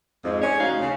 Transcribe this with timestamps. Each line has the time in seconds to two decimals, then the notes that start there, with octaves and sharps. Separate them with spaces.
0.25 F2 G#2
0.42 C#4 D4 G#4 C#5
0.60 D2 F3 D#4 F#4 F5
0.81 C#3